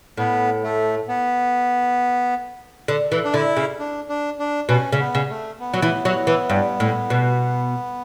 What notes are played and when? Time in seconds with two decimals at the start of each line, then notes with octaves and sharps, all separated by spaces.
0.17 A2 B3
0.63 A3
1.08 B3
2.88 D3
3.12 E3
3.25 D4
3.34 D3 E4
3.57 C#3
3.79 D4
4.09 D4
4.39 D4
4.69 B2 C#4
4.92 C#3
4.99 B3
5.15 C#3
5.30 A3
5.60 B3
5.74 F#3
5.82 E3
6.05 F#3
6.27 E3
6.50 G2
6.80 A2
7.10 B2